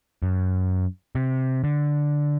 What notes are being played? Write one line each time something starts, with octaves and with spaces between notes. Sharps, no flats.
F#2
C3
D3